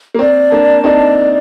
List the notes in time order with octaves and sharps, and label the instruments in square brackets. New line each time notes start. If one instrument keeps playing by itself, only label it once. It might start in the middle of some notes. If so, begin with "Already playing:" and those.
[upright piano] A#3
[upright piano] C4 [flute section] D5
[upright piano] A#3 D4 [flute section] A5
[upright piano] C4 D#4 [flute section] D5